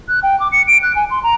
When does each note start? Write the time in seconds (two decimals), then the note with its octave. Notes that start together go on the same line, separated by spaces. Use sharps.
0.09 F#6
0.23 G5
0.40 D6
0.52 C#7
0.68 D7
0.83 F#6
0.96 G#5
1.11 C6
1.24 A#5